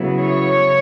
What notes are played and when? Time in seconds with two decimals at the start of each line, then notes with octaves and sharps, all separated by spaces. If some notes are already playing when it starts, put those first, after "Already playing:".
Already playing: C#3 F#3 B3 E4
0.17 C#5